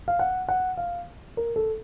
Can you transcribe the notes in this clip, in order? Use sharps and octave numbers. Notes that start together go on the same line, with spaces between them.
F5
F#5
F#5
F5
A#4
A4